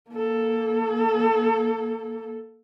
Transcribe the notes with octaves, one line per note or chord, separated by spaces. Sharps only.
A#3 A4